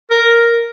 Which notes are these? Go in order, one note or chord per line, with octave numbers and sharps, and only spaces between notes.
A#4